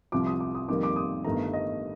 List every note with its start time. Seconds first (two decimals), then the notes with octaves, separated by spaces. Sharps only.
0.12 C2 C3 F3 D6
0.27 D#6
0.40 D6
0.55 D#6
0.68 F2 D#3 G3 A#3 D6
0.83 D6
0.96 D#6
1.24 G1 G2 D#3 A3 A#5
1.53 D#5